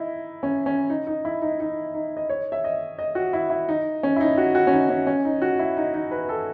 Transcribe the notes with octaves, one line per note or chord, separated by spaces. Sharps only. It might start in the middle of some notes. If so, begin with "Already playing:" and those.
Already playing: D#4 E4
C#4
C#4
D#4
D#4
E4
D#4
D#4
D#4
D#5
C#5
E5
D#5
D#5
F#4
E4
E4
D#4
C#4
E4
D#4
F#4
F#4
C#4
D#4
C#4
C#4
D#4
F#4
E4
D#4
D#4
B4
A4